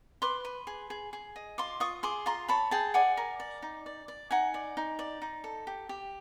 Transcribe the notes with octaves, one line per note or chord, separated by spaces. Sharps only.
B4 C6 D6
B4
G#4
G#4
G#4
D#5
F4 C6 D6
F4 C#6 D#6
G#4 C6 D6
F4 A#5 C6
C#5 A5 B5
G#4 G5 A5
D5 F#5 G#5
A#4
D5
D#4
D5
D5
D#4 F#5 G#5
D5
D#4
D5
D#4
A4
G4
G4